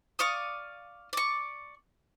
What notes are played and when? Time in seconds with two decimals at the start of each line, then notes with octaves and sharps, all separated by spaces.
0.19 D5 F5 C#6 D#6
1.13 D5 C#6